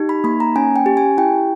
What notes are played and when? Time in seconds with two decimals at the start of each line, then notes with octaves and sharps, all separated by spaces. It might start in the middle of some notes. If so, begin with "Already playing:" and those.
Already playing: D#4 G4
0.09 B5
0.24 A#3 B5
0.40 A#5
0.56 C#4 G#5
0.76 G5
0.86 G4
0.97 G#5
1.18 E4 G5